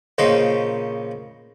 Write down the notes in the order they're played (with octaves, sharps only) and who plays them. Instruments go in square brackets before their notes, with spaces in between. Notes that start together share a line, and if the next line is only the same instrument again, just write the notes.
[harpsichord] A#1 C#3 D#4 C5